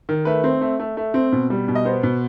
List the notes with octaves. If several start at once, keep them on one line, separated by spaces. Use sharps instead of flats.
D#3
A3 B4
C4
A3
A3
A3
C4
B2
G3
B2
D#5
B3 C5
B2